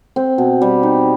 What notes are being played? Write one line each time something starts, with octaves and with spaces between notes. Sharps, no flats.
C4
B2
G3
D#4